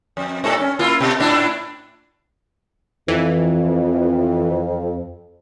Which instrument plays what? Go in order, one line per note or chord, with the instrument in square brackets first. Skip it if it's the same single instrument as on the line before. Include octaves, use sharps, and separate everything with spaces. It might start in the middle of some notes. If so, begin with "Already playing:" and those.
[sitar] F2
G2 A#2 A4
C#4
A#3 E4 F4
B2
A2 D4 E4
[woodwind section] F2 [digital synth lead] E3